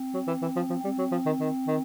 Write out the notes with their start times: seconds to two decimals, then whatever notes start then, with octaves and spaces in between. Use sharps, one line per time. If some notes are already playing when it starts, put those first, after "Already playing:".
Already playing: C4
0.14 F#3
0.27 E3
0.42 E3
0.56 F3
0.70 F3
0.84 G3 C4
0.98 F#3
1.11 F3
1.26 D#3
1.40 D#3
1.67 D#3